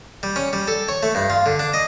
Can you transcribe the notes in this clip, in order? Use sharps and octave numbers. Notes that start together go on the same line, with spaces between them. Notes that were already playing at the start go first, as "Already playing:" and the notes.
G3
C#4
G3
A4
C#5
A3
G2
F4
D3
D4
D#5